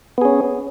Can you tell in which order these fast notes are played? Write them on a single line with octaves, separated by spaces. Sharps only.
B3 G#4 C#4